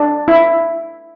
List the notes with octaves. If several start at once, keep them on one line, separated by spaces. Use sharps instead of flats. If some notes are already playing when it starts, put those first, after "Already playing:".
Already playing: D4
E4